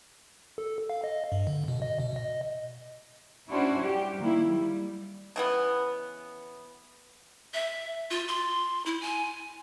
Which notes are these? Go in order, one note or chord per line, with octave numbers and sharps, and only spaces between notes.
A4
F5
D#5
G2
D3
B2
D#5
B2
D#5
C#4 D4 E4 F#4 C5 C#5
G3 G4
D#3 A#3 E4
G3
C#3 E3 B3
E5
F4
C6
E4
G#5